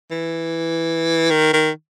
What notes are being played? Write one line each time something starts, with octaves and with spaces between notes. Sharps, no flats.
E3
D#3
D#3